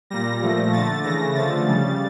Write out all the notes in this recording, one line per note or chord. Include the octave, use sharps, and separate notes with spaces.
A#2 G3 A#6
A#2 F3 A3
D3 A3 A6
C#3 E3 A3 A#6
D3 F3 A3 A6
C#3 G3